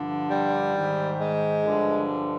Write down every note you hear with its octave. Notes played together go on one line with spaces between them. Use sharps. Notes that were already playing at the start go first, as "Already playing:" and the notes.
Already playing: G2 D3 F3
G3
G#2 D#3
G#3
G2 D3 F3